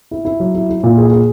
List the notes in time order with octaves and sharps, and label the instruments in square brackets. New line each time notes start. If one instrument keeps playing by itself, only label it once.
[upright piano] E4
E4
F#3
E4
E4
A#2
G#4
G#4